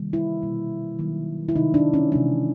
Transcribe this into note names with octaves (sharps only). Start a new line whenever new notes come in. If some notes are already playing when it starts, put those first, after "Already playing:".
Already playing: C3 D#3 G3 A#3
E4
B2 G3 A#3
D#3 F#3 A#3
E4
C3 D#3 G#3 D#4
D4
C#4
C3 E3 G#3 D4